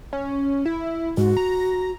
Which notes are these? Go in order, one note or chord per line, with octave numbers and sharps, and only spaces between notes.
C#4
E4
G#2 F#4
A#5